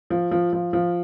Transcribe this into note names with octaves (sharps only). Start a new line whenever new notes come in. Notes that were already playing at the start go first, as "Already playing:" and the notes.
F3
F3
F3
F3